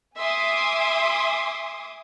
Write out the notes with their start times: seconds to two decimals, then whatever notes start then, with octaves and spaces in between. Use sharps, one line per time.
0.17 E5 G#5 C6 D6 D#6